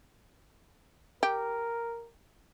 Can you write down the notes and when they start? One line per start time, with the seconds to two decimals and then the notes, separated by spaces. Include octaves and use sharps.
1.23 G4 A#4